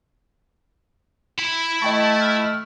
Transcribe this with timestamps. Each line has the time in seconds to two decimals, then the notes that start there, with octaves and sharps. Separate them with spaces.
1.38 E4 B5
1.82 A3 D#5 G5 A5 C#6
2.21 F6